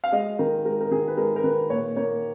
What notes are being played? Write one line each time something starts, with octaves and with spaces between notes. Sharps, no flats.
F5
G#3 D#5
D#3 A#4
G#3 A#4
A#4
D#3 G#4
B4
G#3 A#4
A#4
D#3 B4
A#2 C#5
A#3 C#5